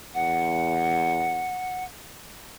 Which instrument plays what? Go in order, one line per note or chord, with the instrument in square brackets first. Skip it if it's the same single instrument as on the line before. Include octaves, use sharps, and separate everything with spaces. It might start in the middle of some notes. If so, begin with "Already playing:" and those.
[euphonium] E2 [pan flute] F#5